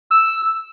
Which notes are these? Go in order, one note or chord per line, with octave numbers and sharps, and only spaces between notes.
E6